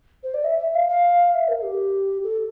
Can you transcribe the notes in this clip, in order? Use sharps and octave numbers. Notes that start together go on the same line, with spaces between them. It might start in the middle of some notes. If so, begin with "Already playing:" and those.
C5
D5
E5
E5
F5
F5
E5
A#4
G4
A4